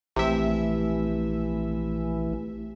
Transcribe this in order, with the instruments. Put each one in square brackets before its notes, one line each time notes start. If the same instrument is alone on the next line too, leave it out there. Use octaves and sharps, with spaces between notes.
[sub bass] A#1 [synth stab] C3 E5 [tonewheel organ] E3 [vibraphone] A3 G4